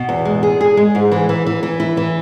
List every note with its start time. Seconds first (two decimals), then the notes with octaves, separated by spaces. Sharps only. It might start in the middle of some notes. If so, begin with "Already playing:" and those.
Already playing: B2
0.09 E2
0.25 G#3
0.43 G#4
0.61 G#4
0.77 G#3
0.95 G#2
1.12 E3
1.29 E3
1.47 E3
1.63 E3
1.80 E4
1.97 E3